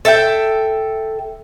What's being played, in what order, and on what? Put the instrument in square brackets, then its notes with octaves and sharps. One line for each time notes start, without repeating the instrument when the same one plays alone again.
[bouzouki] A4 E5 F#5 G5